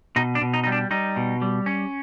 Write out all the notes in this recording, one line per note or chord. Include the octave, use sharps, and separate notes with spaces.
B2 D#4
D4
B2
D#4
G3 D#4
D4
G3 D#4
B2
G3
C#4